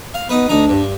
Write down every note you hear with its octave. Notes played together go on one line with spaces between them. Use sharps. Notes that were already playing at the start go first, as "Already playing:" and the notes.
F5
B3 D#4 B4
D2 D4 D#4 A#5
G2